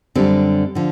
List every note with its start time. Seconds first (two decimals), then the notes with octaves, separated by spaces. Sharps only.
0.15 F#2 D3 G3 C4
0.75 D3 F3